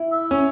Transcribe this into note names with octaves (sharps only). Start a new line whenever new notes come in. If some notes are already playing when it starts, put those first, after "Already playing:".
Already playing: E4
E5
C#4